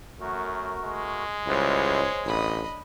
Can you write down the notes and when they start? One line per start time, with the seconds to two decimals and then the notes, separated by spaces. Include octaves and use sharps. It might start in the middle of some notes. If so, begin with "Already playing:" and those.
0.21 F#2 A3 F#4 A#4
0.84 G#3
1.47 C#2 G3 E4 C5 C#5
2.26 A1 D4 D#5 B5